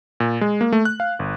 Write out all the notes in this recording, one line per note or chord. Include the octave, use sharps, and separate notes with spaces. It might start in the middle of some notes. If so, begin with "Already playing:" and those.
A#2
G#3
A#3
A3
F#6
F5
G1